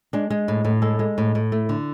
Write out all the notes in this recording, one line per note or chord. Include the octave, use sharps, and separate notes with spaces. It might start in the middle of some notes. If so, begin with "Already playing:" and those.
G#3 D4
G#3
A2
A2
G#3 A4
G#3
A2
A2
A3
D3